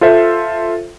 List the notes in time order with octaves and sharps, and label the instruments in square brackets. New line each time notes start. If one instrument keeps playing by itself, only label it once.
[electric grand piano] F4 A4 C5 E5